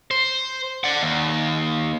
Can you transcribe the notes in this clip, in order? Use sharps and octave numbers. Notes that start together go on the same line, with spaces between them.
C5
D5 F#5
D#2